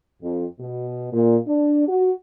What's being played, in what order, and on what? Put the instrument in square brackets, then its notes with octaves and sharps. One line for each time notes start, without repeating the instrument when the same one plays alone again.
[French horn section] F2
B2
A#2
D4
F#4